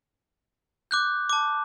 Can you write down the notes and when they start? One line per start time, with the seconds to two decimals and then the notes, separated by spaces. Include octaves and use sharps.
0.91 D6 F#6 G6
1.29 A5 D6